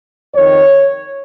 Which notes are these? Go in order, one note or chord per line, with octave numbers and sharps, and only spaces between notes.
F2 D#3 C#5